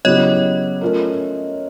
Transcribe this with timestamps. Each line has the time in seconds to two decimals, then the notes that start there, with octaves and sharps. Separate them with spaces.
0.05 C#3 F#3 B3 E4 G4 C#5 D#5
0.81 A3 C#4 F4 A#4